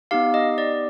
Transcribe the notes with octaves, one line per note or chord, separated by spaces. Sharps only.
B3 D#4 G4 F5
D#5
D5